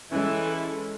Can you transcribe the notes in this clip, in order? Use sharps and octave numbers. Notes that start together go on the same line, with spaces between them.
E3 G#3 C#4 E4 A4